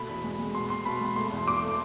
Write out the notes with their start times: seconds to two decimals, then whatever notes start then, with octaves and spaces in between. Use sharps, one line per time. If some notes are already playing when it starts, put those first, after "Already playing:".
Already playing: B2 A3 B5
0.09 E2
0.24 G#3
0.39 G#3
0.54 B2 C6
0.70 B2 C6
0.85 B2 B5
1.01 G#3
1.16 A3 C6
1.32 E2
1.47 E2 D6
1.63 A3